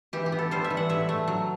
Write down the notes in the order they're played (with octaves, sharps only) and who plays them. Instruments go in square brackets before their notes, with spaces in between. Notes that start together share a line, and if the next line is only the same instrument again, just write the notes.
[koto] E3 G4
G4
B3
A4
G3 C5
E5
E3
F#5
A2 E5
A3
F#3